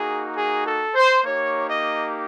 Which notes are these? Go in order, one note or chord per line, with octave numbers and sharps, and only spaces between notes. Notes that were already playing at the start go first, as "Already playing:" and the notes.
Already playing: A#3 D#4 F#4 G#4
G#4
A4
C5
A#3 D#4 G4 C#5
D#5